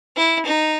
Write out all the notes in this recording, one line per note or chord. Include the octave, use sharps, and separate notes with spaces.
E4
D#4